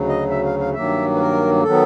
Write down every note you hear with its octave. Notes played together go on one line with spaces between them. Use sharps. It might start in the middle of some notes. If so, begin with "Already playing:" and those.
Already playing: D2 C#3 F#3
D#5
E5
F5
F5
G2 D#3 F#3 A#3 E5
B4
A#4
D#3 F#3 B3 A4